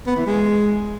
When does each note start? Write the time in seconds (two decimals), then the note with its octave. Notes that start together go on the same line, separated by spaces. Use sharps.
0.07 B3
0.17 E3
0.26 G#3